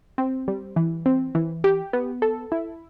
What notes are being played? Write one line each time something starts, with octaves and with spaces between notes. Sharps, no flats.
C4
G3
E3
C4
E3
G4
B3
A4
E4